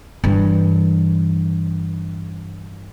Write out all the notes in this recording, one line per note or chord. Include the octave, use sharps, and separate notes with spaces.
G2 E3